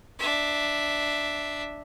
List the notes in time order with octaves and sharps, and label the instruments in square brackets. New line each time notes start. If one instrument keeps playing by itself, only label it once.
[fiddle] D4 E5